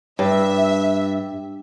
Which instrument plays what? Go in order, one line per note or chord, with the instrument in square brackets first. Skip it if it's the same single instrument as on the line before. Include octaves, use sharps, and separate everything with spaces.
[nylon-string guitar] G2 [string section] E5